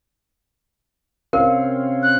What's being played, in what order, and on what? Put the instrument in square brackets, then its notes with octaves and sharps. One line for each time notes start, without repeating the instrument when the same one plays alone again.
[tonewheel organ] C3 C4 C#4 [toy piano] A#4 [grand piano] F5
[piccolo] F#6